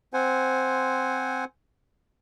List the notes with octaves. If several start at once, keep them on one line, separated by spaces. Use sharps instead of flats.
C4 C5 F#5 G#5